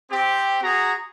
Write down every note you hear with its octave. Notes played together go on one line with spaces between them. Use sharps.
C4 G4
F#4 G#4 A#5